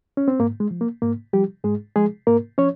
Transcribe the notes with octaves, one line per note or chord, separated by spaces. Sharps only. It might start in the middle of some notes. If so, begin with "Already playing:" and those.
C#4
C4
G#2 A#3
G#3
F3
A#3
G#2 A#3
F3 G3 G4
G#2 G#3 G#4
F3 G#3 G#4
G#2 A#3 A#4
F3 C#4 C#5